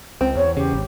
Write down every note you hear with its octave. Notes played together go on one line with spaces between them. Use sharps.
C#2 C4
E2 C#5
C#3 G4
G#1